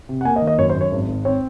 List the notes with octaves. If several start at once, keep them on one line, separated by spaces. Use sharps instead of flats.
C3
F#5
A#3 G#5
D#5
D#3
D#5
F#2 C#5
C5
F#2
C#5
G#1
G#1
C4 C#5